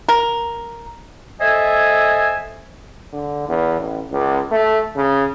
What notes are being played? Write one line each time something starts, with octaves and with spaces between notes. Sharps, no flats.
A#4
A4 C5 D#5 E5 G#5
D3
E2
A1
C#2
A3
C#3